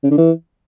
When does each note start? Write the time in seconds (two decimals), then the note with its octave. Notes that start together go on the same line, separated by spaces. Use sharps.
0.04 C#3
0.11 D3
0.18 E3